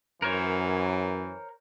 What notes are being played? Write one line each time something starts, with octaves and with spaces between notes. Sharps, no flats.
F#2 E3 A#4 C5 C#5